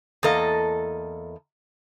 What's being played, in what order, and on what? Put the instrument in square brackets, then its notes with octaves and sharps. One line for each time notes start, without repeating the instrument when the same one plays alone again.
[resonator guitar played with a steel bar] E2 A#3 A4 D#5